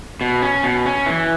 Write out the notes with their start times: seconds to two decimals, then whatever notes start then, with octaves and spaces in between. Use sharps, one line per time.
0.21 B2
0.42 C#4
0.63 B2
0.86 C#4
1.06 E3